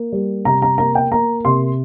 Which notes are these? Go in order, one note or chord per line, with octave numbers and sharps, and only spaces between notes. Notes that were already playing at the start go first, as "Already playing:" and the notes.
Already playing: A#3
G3
C3 A#5
A#5
A#3 A#5
G5
A#3 A#5
C3 C6